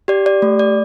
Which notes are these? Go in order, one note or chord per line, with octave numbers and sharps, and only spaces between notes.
G4 D5
D5
A3
D5